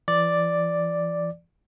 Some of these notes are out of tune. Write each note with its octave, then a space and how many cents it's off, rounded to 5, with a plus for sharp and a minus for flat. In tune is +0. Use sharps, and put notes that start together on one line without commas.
E3 +40 D5 +0